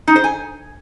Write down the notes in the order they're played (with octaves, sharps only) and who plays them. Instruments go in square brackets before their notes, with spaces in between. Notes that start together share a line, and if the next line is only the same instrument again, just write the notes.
[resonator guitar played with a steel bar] D#4
C5
G#5